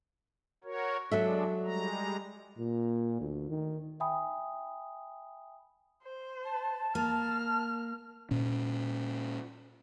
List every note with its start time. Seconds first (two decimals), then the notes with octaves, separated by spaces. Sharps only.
0.64 F#4 A#4 C#5
1.11 F#3 G#3 D4 A4 E5
1.65 G3 G#3 A#5
2.58 A#2
3.20 D2
3.50 D#3
4.00 E5 G5 G#5 B5 D#6
6.03 C5
6.43 A5
6.95 A#3 F6
8.31 A#2 C#4